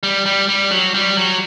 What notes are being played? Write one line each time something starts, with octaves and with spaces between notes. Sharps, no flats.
G3
G3
G3
F#3
G3
F#3